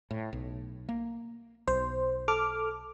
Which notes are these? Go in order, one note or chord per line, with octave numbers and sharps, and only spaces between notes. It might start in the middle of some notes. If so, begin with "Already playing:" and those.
A2
B1
A#3
B1 C5
A4 D6 F6